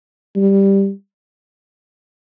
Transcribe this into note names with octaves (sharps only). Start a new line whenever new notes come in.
G3